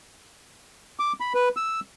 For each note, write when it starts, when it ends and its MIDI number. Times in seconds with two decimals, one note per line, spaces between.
0.99 1.12 86
1.20 1.33 83
1.34 1.49 71
1.56 1.80 88